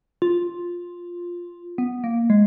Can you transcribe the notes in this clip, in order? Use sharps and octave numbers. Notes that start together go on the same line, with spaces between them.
F4
B3
A#3
G#3